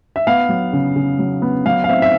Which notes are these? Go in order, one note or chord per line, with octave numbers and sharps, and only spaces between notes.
E5
B3 F5
F#3
C#3
C#3
F#3
B3
F#3 F5
F5
C4 E5
E5